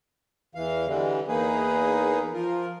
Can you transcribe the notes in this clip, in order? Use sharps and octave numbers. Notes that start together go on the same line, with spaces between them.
E2 E3 F5
D3 E3 G3 G#3
E2 A#3 D#4 G#4 B4
F3 F4 A#4